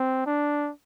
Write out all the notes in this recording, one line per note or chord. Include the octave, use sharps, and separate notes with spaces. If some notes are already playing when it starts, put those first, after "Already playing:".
Already playing: C4
D4